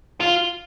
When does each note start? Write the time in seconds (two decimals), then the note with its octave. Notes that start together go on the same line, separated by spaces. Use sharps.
0.21 F4